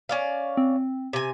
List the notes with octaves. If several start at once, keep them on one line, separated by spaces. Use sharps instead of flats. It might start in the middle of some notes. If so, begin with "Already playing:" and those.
C#4 D5 F5
C4
C3 G#5